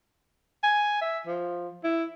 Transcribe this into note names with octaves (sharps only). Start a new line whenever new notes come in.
G#5
E5
F3
E4